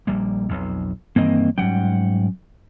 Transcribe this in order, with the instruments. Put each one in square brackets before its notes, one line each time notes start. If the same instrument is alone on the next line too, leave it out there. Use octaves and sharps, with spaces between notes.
[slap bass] A#1 G3 A#3
B1 F2
[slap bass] G2 D#3 E3 [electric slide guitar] A#3 C4 D#5
[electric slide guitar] G#2 F#5 G5 [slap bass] F#3 G3 C#4